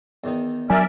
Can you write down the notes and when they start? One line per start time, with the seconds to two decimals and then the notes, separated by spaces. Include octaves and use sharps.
0.24 E2 D#3 D#4
0.70 F#3 D4 A#4 D5 E5 G#5